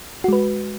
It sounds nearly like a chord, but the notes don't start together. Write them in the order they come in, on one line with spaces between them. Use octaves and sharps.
F#4 G#3 B4